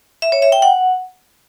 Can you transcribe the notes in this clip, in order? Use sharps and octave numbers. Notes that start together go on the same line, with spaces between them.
E5
C#5
E5
G5
F#5